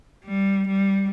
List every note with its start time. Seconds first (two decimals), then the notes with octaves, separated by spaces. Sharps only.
0.25 G3
0.67 G3